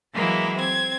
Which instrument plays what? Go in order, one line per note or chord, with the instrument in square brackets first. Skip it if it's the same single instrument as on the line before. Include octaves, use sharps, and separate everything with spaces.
[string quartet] E3 F#3 G#3 A#3 E4
C4 G#6